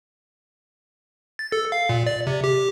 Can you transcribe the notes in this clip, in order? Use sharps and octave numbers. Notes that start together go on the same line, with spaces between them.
A6
A4
F5
A#2
D5
C3
G4